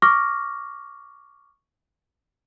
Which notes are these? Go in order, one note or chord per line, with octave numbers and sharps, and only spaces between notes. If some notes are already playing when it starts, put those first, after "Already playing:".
C#6 D6 F6 A#6